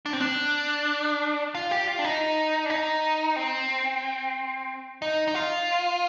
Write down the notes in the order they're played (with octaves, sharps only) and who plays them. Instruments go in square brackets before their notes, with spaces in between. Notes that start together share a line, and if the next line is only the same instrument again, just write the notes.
[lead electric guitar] D4
C4
D4
F4
G4
F4
D4
D#4
D4
D#4
C4
D#4
D#4
F4